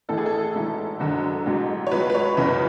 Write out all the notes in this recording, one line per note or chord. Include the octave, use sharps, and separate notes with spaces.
A1 A2 E3 A4
G#4
A4
G#1 G#2 E3
F#1 F#2 D3 F#3
A1 G#2 F#3
C#5
C#2 B2 F#3 B4
B4
C#5
F#1 E2 C#3 E3 B4